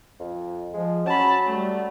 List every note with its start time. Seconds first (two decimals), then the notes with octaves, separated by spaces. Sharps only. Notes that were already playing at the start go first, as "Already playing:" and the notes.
0.20 F2
0.73 F3 G#3
1.06 F#3 C#4 A5 B5
1.46 G3 A3